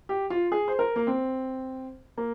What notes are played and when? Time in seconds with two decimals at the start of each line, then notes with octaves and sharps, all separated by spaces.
0.09 G4
0.30 F4
0.52 G#4
0.68 C5
0.79 A#4
0.96 A#3
1.07 C4
2.17 A#3